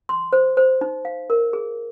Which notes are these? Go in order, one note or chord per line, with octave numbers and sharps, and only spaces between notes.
C6
C5
C5
D#4
F5
A#4
G#4